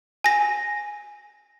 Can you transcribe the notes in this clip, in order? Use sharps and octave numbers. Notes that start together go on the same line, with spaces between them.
G#5 A#6